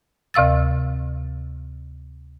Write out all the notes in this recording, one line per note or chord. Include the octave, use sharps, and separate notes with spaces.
D2 C3 F5 E6 A6